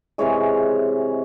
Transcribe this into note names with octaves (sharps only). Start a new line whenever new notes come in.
C3 E3 G#3 C#5